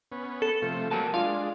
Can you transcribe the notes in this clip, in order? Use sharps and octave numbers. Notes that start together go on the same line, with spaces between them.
B3 C#4
A4
C3 F3 A3
F#3 G3 A#3 A#4 G#5 A5
G#3 D4 F4 F5